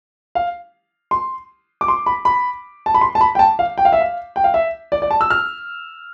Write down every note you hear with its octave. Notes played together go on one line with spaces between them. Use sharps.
F5
C6
D6
C6
B5
B5
A5
B5
C6
A5
B5
G5
A5
F5
G5
F5
E5
F5
G5
F5
E5
D5
D5
A5
E6
F6